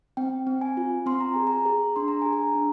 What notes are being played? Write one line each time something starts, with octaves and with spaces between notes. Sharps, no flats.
C4 G5
C4
G#5
F4
C4 C6
A#5
G#4 G#5
A#5
G#4
D4 C6
A#5
G#4 G#5
A#5
D4